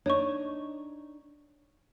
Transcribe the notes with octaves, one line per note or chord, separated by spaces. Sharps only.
D4 D#4 C#5 C#6